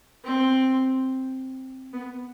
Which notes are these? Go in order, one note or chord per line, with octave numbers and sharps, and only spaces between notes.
C4
B3